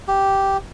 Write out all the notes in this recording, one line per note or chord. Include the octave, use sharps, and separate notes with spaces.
G4